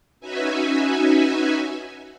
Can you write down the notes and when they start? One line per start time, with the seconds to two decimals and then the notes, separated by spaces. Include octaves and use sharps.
0.20 C#4 D#4 F#4 B4 E5 G#5